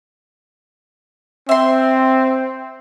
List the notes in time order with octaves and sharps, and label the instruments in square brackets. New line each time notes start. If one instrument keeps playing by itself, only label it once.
[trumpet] C4 [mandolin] E5 C6